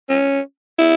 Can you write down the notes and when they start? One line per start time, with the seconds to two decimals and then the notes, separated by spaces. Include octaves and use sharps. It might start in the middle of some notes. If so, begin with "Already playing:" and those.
0.09 C#4
0.79 E4